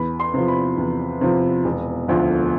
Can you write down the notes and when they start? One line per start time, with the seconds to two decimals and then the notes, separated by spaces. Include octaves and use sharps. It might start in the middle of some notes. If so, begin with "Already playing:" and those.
Already playing: E2 B5
0.20 C6
0.34 C3 F3
0.48 B5
0.77 E2
1.21 C3 F3
1.65 E1
2.08 D2 D3 F3